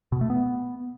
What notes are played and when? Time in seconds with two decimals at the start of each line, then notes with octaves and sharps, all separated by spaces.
0.12 B2
0.21 A3
0.30 B3